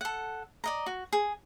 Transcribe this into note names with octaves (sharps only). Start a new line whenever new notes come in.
A4 F#5
D5 D#5 A#5
F#4
G#4